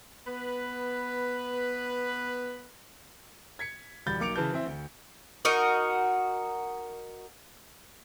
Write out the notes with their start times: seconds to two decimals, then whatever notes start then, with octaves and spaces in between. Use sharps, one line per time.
0.27 B3 B4
3.59 G#6 B6 C#7
4.06 E1 G3 B5 G6 A6
4.20 B1 A#3 D6 C#7 D7 F7
4.36 C#3 E3 B4 A5 G6
4.52 E3 C4 E5
4.65 D2
5.45 D#4 F#4 A#4 D#5